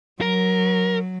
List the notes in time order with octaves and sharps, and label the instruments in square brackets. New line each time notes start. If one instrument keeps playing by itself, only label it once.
[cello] F#3 [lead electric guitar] A#4